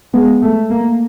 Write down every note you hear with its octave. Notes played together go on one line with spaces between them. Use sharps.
G#3 B3
A3
A#3